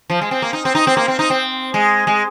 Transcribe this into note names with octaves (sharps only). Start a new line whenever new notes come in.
F3
G#3
C4
A#3
D#4
C4
D#4
C4
A#3
C4
D#4
C4
G#3
G#3